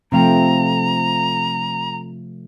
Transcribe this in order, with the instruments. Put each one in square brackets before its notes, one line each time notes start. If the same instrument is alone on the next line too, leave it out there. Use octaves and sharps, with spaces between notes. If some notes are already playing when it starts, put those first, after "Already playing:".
[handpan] C3 F3 A3 [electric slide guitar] C4 F5 G5 [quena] A#5